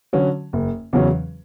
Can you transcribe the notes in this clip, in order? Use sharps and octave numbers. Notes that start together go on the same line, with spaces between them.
D3 F#3 C#4 F#4
F#1
E2 C#3 F#3 C#4